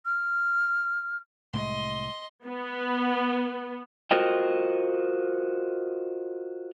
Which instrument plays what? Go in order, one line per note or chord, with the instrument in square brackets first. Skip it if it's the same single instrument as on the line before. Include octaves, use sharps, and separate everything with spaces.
[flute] F6
[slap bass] C2 A2 G#3 [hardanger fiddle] D#5 C6
[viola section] B3
[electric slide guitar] F4 F#4 A#4 C5 D#5 G5